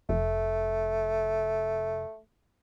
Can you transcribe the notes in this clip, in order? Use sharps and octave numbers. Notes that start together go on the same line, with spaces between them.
F1 A3